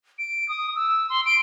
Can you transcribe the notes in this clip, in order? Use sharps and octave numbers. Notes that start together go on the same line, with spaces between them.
D7
D#6
E6
C6
D7